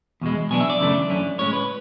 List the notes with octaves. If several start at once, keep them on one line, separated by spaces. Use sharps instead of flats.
E2 B2 G#3
B2 F#3 B3 D4 G#5
E5
D5
F#2 C#3 E3 A3 D4
F#2 D3 A3 C#4
A2 G#3 C#4 C#5
B4